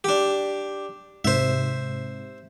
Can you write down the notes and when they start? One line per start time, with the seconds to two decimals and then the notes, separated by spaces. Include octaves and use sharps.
0.04 D4 G4
1.24 G#2 C3 C5 E5